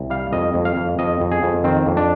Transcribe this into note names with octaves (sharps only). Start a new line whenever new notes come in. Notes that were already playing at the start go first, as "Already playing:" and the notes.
Already playing: C2
G3 F5
F2 D#5
F2
F5
F2
F2 D#5
F2
G#4
F2
D#3 C4
F2
D4